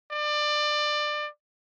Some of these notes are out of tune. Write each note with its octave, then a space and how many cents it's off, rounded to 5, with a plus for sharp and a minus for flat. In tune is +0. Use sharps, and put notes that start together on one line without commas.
D5 +25